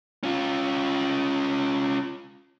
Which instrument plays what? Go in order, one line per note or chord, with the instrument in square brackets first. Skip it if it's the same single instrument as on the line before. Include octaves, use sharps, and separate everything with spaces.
[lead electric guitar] C#4 F4